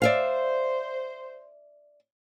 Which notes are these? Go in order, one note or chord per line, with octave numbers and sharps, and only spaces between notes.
C5 D5 E5 F5